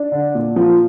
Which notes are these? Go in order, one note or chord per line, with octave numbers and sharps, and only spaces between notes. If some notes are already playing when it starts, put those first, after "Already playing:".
Already playing: D4
D3
A#2
F3